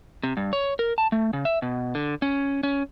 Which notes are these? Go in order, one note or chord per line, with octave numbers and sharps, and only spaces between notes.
C3
G2
C#5
A#4
A5
A3
C#3
E5
B2
D3
C#4
C#4